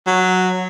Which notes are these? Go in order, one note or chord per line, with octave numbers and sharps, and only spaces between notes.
F#3